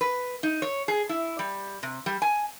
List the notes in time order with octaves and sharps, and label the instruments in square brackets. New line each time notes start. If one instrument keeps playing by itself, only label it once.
[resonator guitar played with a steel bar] B4
D#4
C#5
G#4
E4
G3
C3
G3
G#5